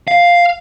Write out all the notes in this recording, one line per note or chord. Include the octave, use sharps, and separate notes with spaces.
F5